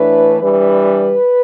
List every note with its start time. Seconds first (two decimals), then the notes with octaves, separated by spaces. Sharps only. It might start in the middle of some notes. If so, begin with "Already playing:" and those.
Already playing: A2 E3 A3 D4 B4
0.40 E3 G3 D4 B4